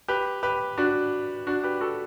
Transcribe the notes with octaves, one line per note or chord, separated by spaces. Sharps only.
G4 B4
G4 B4
D4 F#4
D4 F#4
G4 B4
F#4 A4